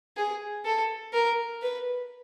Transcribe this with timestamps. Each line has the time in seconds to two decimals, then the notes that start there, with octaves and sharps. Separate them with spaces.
0.17 G#4
0.65 A4
1.13 A#4
1.62 B4